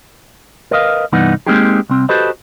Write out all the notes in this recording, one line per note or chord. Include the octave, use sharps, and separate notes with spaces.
A#4 B4 D#5 F5
C2 G2 E3 B3 D#4 F#5
G#3 A#3 C4 D#4 G4 G#4
C2 C4
F#4 G4 A4 B4 C5 D#5